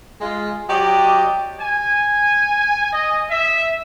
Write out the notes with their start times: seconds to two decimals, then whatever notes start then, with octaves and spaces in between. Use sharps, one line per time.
0.21 G#3 F4
0.68 F#3 G4 D5 D#5
1.59 G#5
2.92 D#5
3.29 E5